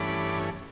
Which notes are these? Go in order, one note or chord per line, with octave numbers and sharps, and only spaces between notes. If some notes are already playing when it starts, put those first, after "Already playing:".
Already playing: G2 E3 A3 C#4 B5 D6